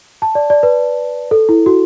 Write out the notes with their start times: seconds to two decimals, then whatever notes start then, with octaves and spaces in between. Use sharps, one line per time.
0.22 A5
0.35 D5
0.50 D5
0.63 B4
1.31 A4
1.49 E4
1.66 F#4